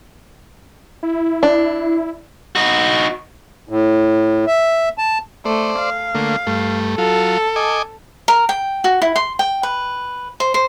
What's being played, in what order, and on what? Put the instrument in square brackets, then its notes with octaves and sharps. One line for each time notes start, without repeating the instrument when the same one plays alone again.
[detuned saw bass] E4
[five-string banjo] D4
[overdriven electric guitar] D#4 F#4
[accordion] A2
E5
A5
[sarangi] A3 [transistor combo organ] C5 D5
[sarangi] F5
[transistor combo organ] D3 A3 A#3
G2 A3
[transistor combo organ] F#3 F4 [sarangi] A4
[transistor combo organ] D#5 G#5 D6
[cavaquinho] A#4
G5
F#4
E4
C6
G5
B4
C5
C5